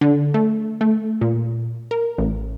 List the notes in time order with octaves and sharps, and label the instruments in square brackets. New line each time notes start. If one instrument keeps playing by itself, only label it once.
[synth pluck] D3
A3
A3
A#2
A#4
A1